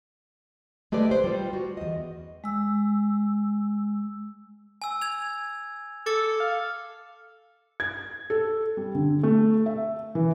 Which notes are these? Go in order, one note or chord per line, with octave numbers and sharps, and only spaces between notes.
G#3 A3 G4 B4 D5
B4 C5
G3 F4
F#4
E2 D#5
G#3 E6
G#5 E6
G#6 F7
A4 D6 A6 C#7
F5
G#6
A4
G3
D3
A3
E5
E3